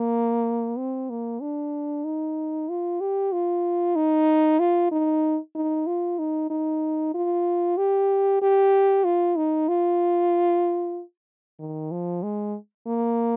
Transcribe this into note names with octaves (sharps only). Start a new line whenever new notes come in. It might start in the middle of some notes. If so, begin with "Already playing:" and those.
Already playing: A#3
C4
A#3
D4
D#4
F4
G4
F4
D#4
F4
D#4
D#4
F4
D#4
D#4
F4
G4
G4
F4
D#4
F4
D#3
F3
G#3
A#3